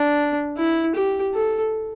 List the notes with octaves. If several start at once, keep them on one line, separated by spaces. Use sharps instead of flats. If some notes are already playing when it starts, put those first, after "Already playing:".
Already playing: D4
E4
G4
A4